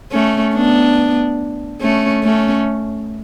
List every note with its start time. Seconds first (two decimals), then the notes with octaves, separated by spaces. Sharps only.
0.12 A3 C#4
0.55 B3 D4
1.81 A3 C#4
2.24 A3 C#4